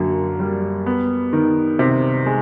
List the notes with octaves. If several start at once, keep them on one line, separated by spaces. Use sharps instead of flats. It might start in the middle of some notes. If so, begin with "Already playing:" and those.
Already playing: F#2 D3 A#3
G3
B3
D#3
C3
G#3